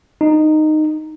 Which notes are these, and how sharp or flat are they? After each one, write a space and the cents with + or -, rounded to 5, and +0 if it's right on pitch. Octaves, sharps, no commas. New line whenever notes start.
D#4 -10